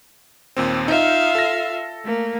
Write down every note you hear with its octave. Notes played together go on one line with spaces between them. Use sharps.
D#2 A#2 C4
D#4 F4 E5 F5
A4 A#6
A3 A#3